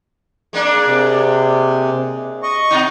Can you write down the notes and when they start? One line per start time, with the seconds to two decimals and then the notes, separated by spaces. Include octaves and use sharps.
0.53 G#3 A#3 D4
0.87 C3
2.43 D#5 C#6
2.71 B2 D#4